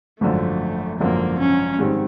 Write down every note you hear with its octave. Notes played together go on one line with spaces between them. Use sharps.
G#1 F#2 D3 F3 A3
G#1 F#2 D3 F3 A#3
C#4
G#2 D#3 G3 C4